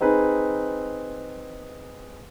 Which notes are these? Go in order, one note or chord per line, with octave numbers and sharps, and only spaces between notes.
C4 D#4 G#4 B4